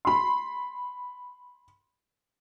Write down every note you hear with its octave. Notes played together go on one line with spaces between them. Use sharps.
B5 C6